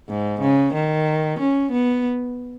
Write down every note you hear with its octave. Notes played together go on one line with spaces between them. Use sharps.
G#2
C#3
D#3
C#4
B3